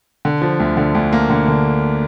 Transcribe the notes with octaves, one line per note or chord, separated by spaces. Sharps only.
D3
F3
D2
D3
D2
A#3
D3
D3